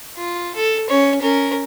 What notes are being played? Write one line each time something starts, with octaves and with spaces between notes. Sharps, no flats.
F4
A4
C#4 C#5
C#4 A#4